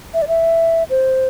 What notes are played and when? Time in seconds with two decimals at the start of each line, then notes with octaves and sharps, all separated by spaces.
0.14 E5
0.22 D5
0.28 E5
0.90 C5